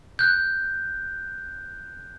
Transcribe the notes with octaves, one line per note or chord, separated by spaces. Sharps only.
F#6 G6